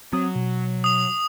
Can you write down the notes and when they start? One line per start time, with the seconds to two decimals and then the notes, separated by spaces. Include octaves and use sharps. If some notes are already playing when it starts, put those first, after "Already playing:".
0.13 F#3 C4 D#6
0.35 B2
0.84 D#6 F7